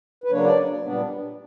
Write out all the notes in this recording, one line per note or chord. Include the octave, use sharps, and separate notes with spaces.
B4
C#3 F#3 A#3 D4 C#5
D5
A#2 G3 B3 D4